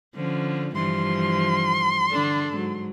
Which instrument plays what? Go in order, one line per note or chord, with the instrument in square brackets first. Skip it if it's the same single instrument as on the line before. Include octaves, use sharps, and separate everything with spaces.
[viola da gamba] D3 F3 C#4
[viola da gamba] G2 E3 F3 [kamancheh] C6
[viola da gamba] D3 D4 A4
G#2 F#3